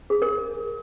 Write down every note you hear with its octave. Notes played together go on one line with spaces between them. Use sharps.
G#4
A#4